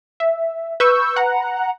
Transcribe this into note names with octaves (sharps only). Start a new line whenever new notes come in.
E5
B4 C#6 E6 G6
F#5 A#5